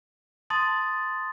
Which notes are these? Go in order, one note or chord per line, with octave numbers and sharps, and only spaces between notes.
A5 C6 D#6 A6